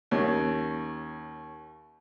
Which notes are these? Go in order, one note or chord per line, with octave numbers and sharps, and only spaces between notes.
D#2 C#4